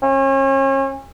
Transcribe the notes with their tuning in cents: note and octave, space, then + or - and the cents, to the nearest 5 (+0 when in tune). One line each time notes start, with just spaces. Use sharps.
C#4 -35